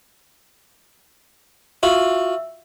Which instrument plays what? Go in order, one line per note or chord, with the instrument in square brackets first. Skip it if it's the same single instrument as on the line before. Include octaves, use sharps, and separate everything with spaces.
[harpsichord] F4 F#4 [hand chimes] E5